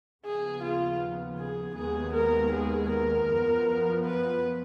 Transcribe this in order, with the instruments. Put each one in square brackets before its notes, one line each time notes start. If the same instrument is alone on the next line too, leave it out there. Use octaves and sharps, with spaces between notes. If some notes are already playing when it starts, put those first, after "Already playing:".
[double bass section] D#2 C#3 F3 B3 [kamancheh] G#4
[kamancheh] F4
G#4
[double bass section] D#2 D#3 G#3 B3 [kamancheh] G#4
[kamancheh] A#4
G#4
A#4
[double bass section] F#2 F3 B3
[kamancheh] B4